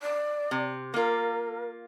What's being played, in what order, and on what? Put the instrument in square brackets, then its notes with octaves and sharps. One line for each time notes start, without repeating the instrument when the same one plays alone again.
[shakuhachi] D5
[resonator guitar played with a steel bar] C3
[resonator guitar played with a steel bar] A#3 F4 [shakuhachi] A#4